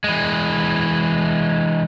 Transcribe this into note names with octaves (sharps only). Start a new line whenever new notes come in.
E3 G#3